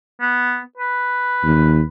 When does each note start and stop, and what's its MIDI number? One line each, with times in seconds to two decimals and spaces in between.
0.21 0.60 59
0.77 1.87 71
1.43 1.81 39